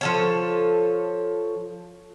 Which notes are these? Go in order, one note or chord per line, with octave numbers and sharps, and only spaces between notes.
F3 A4 C#5